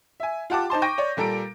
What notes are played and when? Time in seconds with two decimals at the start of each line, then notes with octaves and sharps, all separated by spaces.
0.20 E5 G#5
0.50 F4 G4 F#5 A5 D6
0.70 D#4 C5 A5 C6
0.82 G5 C#6 G6 A#6 D#7
0.98 C#5 D5
1.17 A#2 G3 A4 A#5 D7